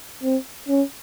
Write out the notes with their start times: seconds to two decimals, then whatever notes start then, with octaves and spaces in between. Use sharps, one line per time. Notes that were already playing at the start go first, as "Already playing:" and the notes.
0.23 C4
0.68 C#4